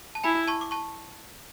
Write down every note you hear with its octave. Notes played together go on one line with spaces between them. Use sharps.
A5
E4 G#5 B5
A5 C#6
D6
A5 C#6